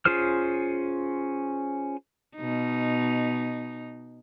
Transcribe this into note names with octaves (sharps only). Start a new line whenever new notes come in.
C#4 F4 G#4 C5 F6
B2 D#4